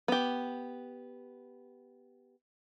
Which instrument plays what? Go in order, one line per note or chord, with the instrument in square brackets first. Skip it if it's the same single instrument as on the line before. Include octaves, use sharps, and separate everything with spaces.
[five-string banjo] B3 G4